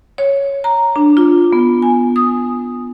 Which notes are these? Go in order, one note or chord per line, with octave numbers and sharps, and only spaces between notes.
C#5
A#5
D4
F4
B3
G#5
D#6